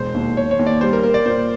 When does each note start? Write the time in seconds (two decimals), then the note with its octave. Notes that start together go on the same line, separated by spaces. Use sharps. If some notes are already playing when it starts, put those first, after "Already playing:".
Already playing: E1 C5
0.15 D#2
0.37 D#2 C#5
0.51 C#5
0.59 D#2
0.67 D5
0.81 G3 C5
0.93 A#4
1.03 A#3 A#4
1.14 D5
1.26 A#2 C5